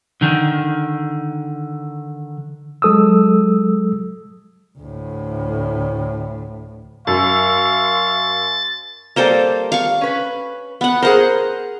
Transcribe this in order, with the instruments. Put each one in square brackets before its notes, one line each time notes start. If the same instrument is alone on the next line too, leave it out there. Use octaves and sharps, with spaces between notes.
[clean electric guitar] D3 D#3
[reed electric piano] F#3 G#3 A4 D#6 E6
[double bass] D2 A2
[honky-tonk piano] F#2 [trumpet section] F5 C6 C#6 [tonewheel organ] A6
[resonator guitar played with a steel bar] G3 A#3 [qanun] A4 C5 F5
[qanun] F5 C#6
[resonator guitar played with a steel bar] C#4 B4
[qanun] B3 F#5
[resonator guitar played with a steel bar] G#4 A#4 [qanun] C5 F#5